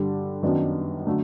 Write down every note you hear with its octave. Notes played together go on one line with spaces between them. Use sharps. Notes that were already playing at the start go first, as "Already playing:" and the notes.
Already playing: G2 D3 G3
F#2 D#3 F#3 B3 D4
D3 F#3 A3